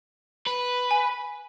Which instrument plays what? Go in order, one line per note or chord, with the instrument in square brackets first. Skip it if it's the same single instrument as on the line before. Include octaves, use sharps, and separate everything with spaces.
[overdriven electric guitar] B4
[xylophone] G#5